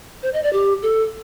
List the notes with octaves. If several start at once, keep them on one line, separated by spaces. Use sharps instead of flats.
C5
D#5
D5
G4
A4